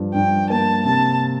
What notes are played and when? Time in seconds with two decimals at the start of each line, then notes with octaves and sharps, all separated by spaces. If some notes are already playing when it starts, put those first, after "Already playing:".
Already playing: G2 F3
0.14 G2 G5
0.49 A#3 A5
0.85 C3 A5